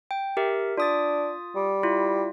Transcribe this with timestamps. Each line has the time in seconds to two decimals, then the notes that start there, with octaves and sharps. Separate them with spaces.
0.11 G5
0.37 G4 A#4 E5
0.77 D4 F4 D#6 A6
1.56 G3
1.83 E4 F4